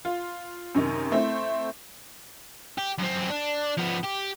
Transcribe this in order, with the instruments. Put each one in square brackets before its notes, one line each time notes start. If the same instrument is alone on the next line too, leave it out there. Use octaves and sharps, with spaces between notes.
[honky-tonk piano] F4
F#2 C3 D#3 C#4 D#4
A3 C4 E4
[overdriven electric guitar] G4
F#2 C4
D4
F3 B3
G4